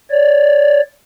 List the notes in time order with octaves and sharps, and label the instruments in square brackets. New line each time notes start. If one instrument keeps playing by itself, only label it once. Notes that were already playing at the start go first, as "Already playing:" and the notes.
[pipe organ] C#5 D5